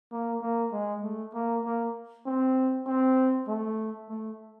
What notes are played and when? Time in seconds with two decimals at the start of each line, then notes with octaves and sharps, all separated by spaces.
0.12 A#3
0.42 A#3
0.72 G#3
1.03 A3
1.34 A#3
1.65 A#3
2.26 C4
2.86 C4
3.48 A3
4.09 A3